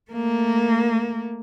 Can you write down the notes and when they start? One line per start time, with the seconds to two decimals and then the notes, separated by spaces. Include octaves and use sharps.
0.11 A3 A#3